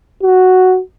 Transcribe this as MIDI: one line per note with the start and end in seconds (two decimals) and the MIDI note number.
0.23 0.80 66